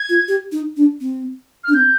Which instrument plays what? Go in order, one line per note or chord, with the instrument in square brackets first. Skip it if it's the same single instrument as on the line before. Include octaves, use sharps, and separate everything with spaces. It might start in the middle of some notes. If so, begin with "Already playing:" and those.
Already playing: [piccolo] G#6
[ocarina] F4
G4
D#4
D4
C4
[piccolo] F6
[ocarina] D4
[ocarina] C4 [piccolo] G6